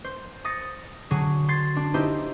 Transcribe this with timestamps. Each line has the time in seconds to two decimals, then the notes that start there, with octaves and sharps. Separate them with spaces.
0.04 C5
0.45 D#6 A6 A#6 C#7
1.11 D3 F#3 D4 F#4 G#4
1.48 C6 G#6 A6 C7
1.76 D4
1.94 D#4 E4 G4 C5